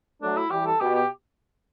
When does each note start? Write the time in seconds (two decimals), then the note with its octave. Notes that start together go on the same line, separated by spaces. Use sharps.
0.22 F#3 A3 D4
0.37 E4
0.51 E3 G3 G4
0.66 A4
0.81 B2 G4
0.95 G4